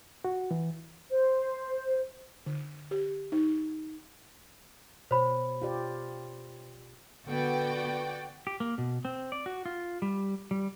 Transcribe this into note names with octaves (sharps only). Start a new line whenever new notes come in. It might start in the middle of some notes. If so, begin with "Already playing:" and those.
F#4
E3
C5
D3
G4
D#4
B2 C5 C#5 B5
F4 G4 D5
D3 B3 F#4 D5 G5
G4
A#3
B2
C4
D5
F#4
F4
G3
G3